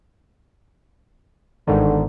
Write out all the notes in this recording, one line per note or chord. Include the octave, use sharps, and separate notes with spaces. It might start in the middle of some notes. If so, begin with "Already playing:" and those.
G1 G#2 D3 D#3